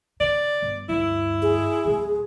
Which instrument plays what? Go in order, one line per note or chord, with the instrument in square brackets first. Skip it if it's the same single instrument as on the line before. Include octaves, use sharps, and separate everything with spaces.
[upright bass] C#3 [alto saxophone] D5
[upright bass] G1
[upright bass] D2 G2 [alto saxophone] E4
[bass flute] G#4
[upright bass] D1 G#3